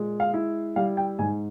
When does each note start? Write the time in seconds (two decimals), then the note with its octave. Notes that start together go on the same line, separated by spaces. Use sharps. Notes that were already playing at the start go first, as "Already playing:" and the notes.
Already playing: A#2 G#3
0.20 F5
0.34 E4
0.76 G3 F5
0.97 G5
1.19 G#2 G#5